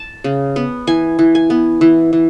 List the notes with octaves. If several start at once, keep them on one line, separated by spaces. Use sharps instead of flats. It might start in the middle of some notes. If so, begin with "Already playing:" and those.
Already playing: A5
C#3
B3
E3 G#5
E3
G#5
B3
E3
E3